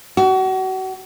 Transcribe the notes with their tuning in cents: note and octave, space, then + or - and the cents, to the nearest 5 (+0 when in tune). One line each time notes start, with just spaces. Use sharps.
F#4 +30